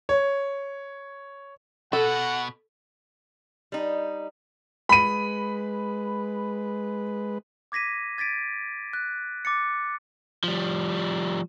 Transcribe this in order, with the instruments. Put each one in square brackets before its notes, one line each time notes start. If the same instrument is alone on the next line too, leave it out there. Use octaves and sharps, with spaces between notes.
[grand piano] C#5
[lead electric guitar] B2 [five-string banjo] A4 [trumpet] F#5
[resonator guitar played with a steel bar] G3 D#4
[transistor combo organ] G#3 B4 [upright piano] B5 D#7
[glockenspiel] D6 G#6 A#6 B6 D#7
G#6 A6 B6 D7 D#7
F#6
D6 A6 C#7
[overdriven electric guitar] F3 G3